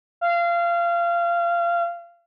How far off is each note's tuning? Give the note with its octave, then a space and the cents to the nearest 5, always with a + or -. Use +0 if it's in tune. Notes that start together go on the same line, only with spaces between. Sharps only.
F5 -25